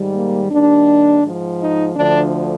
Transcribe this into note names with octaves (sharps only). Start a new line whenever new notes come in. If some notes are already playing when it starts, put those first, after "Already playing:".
Already playing: G#2 D#3 G3
A#3
D#2 D#3 G3 D4
G#2 F3
D#4
D2 D3 F3 D4